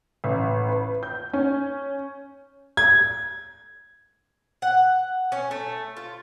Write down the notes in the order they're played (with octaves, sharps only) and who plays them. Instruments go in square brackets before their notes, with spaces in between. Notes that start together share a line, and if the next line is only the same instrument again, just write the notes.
[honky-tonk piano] A1
B4
G6
C#4
[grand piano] G#6
[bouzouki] F#5
C#4
A3
F4